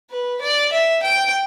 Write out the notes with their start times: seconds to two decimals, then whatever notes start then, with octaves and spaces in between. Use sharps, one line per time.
0.10 B4
0.41 D5
0.72 E5
1.03 G5